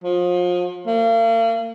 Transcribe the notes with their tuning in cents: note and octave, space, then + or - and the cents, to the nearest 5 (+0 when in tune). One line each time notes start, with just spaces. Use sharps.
F3 +30
A#3 -40